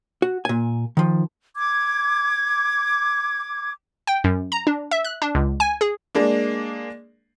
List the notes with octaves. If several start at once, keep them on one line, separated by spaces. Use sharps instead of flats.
F#4
A#2 G#5
D#3 F3
D6 G#6
G5
F#2
A#5
D4
E5
F#6
D4
C#2
G#5
G#4
G#3 A#3 D4